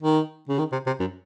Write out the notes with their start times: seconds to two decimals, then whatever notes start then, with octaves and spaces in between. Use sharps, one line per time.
0.02 D#3
0.49 C#3
0.59 D#3
0.72 C3
0.86 C3
1.00 F#2